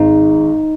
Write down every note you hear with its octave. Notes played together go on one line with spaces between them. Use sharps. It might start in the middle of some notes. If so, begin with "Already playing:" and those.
Already playing: G#1 G#2 D#3 G#3 D#4